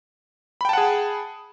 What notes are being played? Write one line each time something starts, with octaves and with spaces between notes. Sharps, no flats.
G#4 F#5 G5 A5 B5